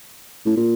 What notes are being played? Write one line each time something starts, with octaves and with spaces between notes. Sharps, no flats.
A2
A#2